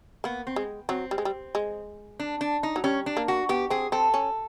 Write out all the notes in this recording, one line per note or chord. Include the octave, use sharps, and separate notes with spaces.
A#3 B3
C4
G#3
F#3 C4
G3
G#3
G3
G#3
D4
D4
D#4
F#3
G3 C#4
D4
A#3
F#4
B3 G4
C4 G#4
C4 A4
C#4